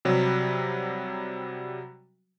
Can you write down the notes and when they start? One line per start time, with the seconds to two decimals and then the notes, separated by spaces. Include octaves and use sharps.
0.05 C3 F#3 G3